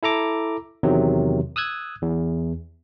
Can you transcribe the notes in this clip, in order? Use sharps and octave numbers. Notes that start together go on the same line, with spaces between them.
E4 A4 A#5 D6
E2 C3 D#3 F#3
D#6 E6 F#6 G#6
E2